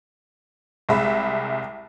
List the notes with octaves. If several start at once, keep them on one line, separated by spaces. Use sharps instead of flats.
C2 G#3 E5 B5